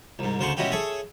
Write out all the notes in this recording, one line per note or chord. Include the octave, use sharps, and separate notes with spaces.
C2 G#2
D2 C#3 C5 F#5 A5 C#6
B2 G#3 C#4 E4 F#4 G4
G#4 A4 C#5 E5